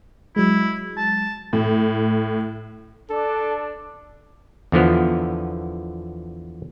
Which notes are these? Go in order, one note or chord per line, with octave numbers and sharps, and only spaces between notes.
F#3 G#3 E4
A5
A2
D4 A4
E2 D3 F3 B3